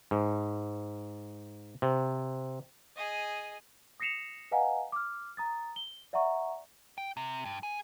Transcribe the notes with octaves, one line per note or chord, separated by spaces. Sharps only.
G#2
C3
G#4 D#5
D#6 A#6 C7 C#7 E7 F7
B4 D#5 F5 F#5 G#5 A#5
D6 F6
A#5 D#6 A6
G7
D5 E5 F#5 A#5 C#6
G5
C3
G2
G#4